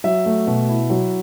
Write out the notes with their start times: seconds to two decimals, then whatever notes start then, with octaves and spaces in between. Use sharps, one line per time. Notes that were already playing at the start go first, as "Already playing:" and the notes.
0.04 F#3 E5
0.26 A3
0.47 B2
0.68 E4
0.90 F#3